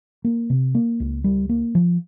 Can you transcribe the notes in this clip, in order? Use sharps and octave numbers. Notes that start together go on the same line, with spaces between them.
A#3
C3
A#3
C#2
G3
A#3
F3